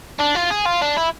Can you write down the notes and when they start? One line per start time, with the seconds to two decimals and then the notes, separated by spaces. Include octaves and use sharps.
0.19 D4
0.35 F4
0.50 G#4
0.65 F4
0.82 D4
0.97 E4